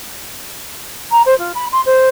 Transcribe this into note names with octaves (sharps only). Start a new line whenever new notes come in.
A#5
C5
F4
B5
C6
C5